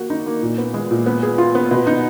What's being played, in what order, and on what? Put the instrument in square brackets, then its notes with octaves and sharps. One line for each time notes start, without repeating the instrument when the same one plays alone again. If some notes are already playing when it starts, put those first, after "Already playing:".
Already playing: [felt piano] A#3 F#4
D#4
A#3
A#2
B3
G#3
A#2
B3
G#4
F4
B3
B2
D#4